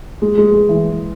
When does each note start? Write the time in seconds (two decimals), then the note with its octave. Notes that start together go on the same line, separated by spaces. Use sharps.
0.22 G#3
0.38 G#3
0.54 G#3
0.69 E3